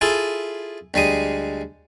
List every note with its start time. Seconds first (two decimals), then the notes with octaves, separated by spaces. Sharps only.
0.01 E4 F4 G#4 A4
0.94 D2 G3 G#3 D#6